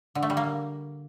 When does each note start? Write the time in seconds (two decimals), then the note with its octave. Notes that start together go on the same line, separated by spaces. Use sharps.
0.15 D3
0.23 A3
0.30 G3
0.37 A#3